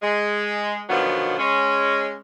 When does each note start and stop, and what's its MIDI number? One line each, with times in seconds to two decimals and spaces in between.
0.02 0.80 56
0.89 1.37 47
0.89 1.37 50
0.89 1.37 51
0.89 1.37 53
0.89 1.37 54
0.89 1.37 59
1.38 2.14 56
1.38 2.14 61